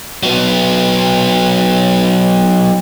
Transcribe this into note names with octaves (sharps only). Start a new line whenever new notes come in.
F#3 B3